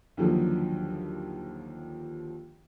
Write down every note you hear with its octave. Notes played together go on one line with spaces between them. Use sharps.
D#2 D3 F3 F#3